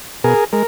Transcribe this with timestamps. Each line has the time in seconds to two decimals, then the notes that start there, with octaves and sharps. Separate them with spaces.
0.24 B2 G#4 A#4
0.53 G#3 A#4